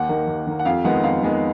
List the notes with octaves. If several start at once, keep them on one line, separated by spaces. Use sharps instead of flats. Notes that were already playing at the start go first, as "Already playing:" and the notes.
Already playing: D#2 F#5
D#3 A#3
D#2
D#3 A#3
F#5
F2 F5
D#3 G#3 B3 F#5
F2 F5
D#3 G#3 B3